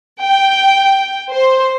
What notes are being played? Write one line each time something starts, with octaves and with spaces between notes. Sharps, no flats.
G5
C5